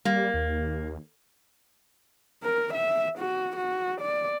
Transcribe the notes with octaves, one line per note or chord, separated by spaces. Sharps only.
G3 A#3
D#2
A#4
E5
F#4
F#4
D5